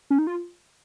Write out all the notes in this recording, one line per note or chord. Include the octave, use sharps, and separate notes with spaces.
C#4
D#4
F4